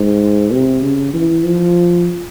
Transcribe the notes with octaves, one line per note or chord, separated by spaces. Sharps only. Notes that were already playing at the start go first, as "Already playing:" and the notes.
Already playing: G#2
C3
C#3
E3
F3